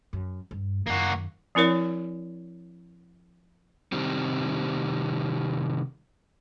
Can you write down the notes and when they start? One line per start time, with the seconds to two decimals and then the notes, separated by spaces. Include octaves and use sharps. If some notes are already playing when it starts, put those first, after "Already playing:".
0.13 F#2
0.51 G2
0.87 F#2 D#3 A#3 F#4
1.55 F3 C4 E4 A#4 C#5
3.92 C3 D#3 G3 C4